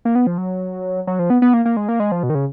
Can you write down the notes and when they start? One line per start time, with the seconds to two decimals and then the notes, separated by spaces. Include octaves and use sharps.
0.05 A#3
0.15 B3
0.27 F3
0.38 F#3
1.07 F#3
1.19 F3
1.30 B3
1.42 B3
1.54 A#3
1.65 A#3
1.77 G#3
1.89 A#3
2.00 G#3
2.12 F3
2.23 B2
2.30 D#3
2.35 C#3